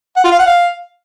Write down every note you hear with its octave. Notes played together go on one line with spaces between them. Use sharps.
F#5
F4
F5
F#5
F5